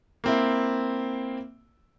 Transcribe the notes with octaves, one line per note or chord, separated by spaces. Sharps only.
A#3 C4 E4